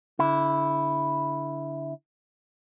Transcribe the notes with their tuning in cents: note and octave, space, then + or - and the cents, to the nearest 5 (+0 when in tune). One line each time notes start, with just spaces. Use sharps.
D3 -30 E4 -5